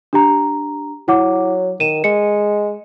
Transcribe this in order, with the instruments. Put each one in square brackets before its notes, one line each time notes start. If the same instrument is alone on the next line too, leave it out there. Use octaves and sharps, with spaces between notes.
[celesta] D4 G4 A#5
[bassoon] F#3 [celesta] E4 F#5 D6
[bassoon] D#3 [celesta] D#7 E7
[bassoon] G#3 [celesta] C#7